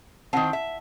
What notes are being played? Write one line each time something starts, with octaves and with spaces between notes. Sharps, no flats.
D#3 C4 E4 F#5 A5
E5